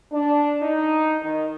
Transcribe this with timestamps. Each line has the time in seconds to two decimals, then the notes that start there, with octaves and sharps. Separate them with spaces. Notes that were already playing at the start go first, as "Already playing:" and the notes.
0.12 D4
0.61 D#4
1.22 D#3